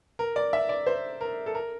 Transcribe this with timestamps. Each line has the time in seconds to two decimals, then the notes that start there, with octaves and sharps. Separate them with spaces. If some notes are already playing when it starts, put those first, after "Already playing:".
0.19 A#4
0.36 D5
0.53 E5
0.69 D5
0.86 C5
1.21 A#4
1.46 A4
1.55 A#4